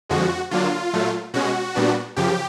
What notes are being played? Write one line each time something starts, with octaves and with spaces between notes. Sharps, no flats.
F2 D3 F3 G#3 F#4
D3 F#3 A#3 D4 F4
A#2 F#3 A3
B2 G#3 C#4 F#4
A#2 G3 B3 D4
F#2 C#3 F3 G4